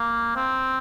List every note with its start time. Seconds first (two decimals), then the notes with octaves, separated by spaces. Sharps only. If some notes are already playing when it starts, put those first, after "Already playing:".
Already playing: A#3
0.36 C4